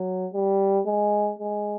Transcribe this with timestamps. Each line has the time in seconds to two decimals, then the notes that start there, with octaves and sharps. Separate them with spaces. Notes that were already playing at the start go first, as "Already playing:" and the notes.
Already playing: F#3
0.34 G3
0.86 G#3
1.39 G#3